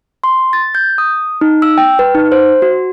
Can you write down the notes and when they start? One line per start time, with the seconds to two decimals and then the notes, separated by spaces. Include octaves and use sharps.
0.24 C6
0.53 A6
0.75 G6
0.98 D#6
1.41 D#4
1.62 E6
1.78 G5
1.99 B4
2.15 D#4
2.32 C5
2.62 F#4